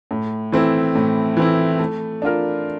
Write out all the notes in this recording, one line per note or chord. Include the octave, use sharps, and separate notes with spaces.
A2
E3 A3 C4 E4
A2
E3 A3 C4 E4
A3
D4 F4 A#4